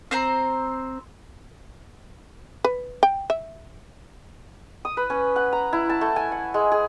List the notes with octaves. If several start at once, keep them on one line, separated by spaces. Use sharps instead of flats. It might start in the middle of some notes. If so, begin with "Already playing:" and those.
C4 C5 A#5
B4
G5
E5
D#6
B4
C#4
F#5
A#5
E4
A5
A3
G#5
F#5
G#3
G#4